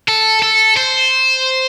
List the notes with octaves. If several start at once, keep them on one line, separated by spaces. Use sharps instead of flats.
A4
A4
C5